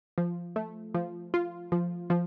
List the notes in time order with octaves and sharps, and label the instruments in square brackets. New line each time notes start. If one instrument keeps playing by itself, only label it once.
[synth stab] F3
A3
F3
F4
F3
F3